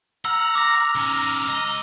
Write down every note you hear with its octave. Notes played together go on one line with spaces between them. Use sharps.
F#5 A#5 E6 F6
D6 A#6
D#3 C#4
C#2 D#5